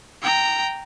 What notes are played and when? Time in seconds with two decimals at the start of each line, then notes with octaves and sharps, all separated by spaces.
0.22 G5 A#5